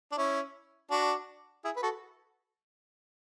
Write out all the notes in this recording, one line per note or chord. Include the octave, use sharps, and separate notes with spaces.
D4
C#4 E4
D4 F#4
E4 G#4
B4
F#4 A4